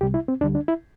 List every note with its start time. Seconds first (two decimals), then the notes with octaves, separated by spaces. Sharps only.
0.01 C2 C3 G3 G4
0.14 E4
0.28 C4
0.41 D2 D4
0.44 D3 G3
0.55 D4
0.68 E4